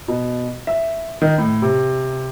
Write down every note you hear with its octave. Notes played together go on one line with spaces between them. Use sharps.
B2
E5
D#3
A2
C3